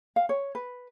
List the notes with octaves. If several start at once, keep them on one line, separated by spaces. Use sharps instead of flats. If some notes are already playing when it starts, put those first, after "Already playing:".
F5
C#5
B4